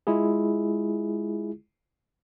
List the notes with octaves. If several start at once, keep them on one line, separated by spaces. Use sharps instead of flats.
G#3 E4 F4 G#4